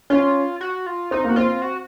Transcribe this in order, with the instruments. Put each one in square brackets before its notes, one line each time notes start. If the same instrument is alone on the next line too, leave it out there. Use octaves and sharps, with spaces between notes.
[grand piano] C#4 [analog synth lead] F4
[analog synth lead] F#4
F4
[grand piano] C4 [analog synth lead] D#4
[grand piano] A#3 [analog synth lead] F#4
[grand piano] C4 [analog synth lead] F4
[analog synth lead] F#4